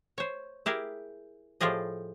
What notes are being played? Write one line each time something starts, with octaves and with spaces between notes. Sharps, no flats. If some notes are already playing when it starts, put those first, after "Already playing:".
C5 C#5
E4 G4 G#4 A#4
A2 F3 F4 G4 G#4 D#5